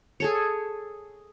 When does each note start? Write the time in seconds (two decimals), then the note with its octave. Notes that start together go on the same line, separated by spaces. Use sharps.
0.20 G#4 A4 C#5